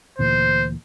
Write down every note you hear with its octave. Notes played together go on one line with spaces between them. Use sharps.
D2 A#2 E3 C5